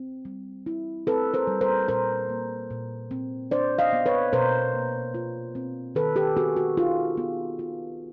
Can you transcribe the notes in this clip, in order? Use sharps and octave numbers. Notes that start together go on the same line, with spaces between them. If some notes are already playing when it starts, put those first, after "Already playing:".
Already playing: C4
G3
E4
C4 A4 B4
A#4 C5
G3
A#4 C5
A#2 A#4 C5
A#3
A#2
C4
D4 C5 D5
D#5 F5
B3
B4 C#5
B2 A#4 C5
A#3
F4
C4
D#3 A4 B4
G4 A4
B3 F#4 G#4
F#4
D#4 F4 G4
B3
F4